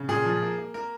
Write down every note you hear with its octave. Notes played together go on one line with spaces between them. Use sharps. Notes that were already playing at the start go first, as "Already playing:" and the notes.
Already playing: C#3
A#2 G#4
F3
A#3
A#3
A#3 A#4